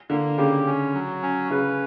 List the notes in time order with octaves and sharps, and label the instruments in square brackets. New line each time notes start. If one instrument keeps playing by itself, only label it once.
[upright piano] D3 [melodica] A#3
[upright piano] C#3 [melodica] G4
[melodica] C#4
F#3
C#4
[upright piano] C#3 [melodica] B4